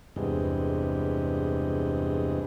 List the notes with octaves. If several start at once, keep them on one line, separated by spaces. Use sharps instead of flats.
E2 G2 C3 G#3